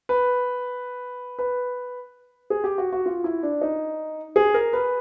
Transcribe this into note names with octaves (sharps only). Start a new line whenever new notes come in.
B4
B4
G#4
G4
F#4
F#4
F4
E4
D4
D#4
G#4
A#4
B4